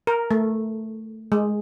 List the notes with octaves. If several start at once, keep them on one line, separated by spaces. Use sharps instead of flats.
A#4
A3
G#3